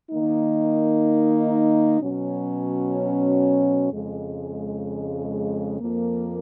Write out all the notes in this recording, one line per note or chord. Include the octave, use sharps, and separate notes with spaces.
D#3 A#3 D#4
B2 F#3 C#4
F2 C#3 G#3
F2 F3 A#3